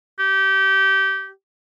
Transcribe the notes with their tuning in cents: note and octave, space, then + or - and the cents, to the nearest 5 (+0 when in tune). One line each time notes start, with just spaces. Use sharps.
G4 -20